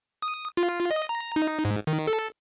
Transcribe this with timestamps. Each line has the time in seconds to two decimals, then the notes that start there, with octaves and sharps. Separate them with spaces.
0.22 D#6
0.57 F4
0.91 D#5
1.09 A#5
1.36 D#4
1.65 G#2
1.87 D#3
2.07 A4